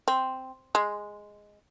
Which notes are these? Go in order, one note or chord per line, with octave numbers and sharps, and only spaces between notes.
C4
G#3